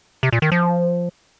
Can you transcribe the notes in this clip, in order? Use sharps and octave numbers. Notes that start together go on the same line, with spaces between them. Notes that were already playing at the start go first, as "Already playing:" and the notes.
C3
A#2
D#3
F3